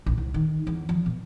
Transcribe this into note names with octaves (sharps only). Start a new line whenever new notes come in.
A#1
C2
D#3
E2
F3
B2